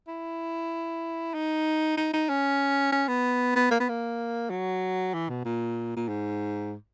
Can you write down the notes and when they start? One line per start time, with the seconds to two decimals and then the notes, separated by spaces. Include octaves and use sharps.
0.08 E4
1.34 D#4
1.97 D#4
2.14 D#4
2.29 C#4
2.92 C#4
3.08 B3
3.55 B3
3.71 A#3
3.80 B3
3.89 A#3
4.50 F#3
5.14 E3
5.29 B2
5.45 A#2
5.96 A#2
6.08 G#2